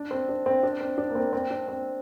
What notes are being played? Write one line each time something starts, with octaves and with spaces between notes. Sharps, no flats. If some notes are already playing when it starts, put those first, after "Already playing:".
Already playing: D4
C4
D4
C4
D4
C4
D4
A#3
C4
C4
D4
C4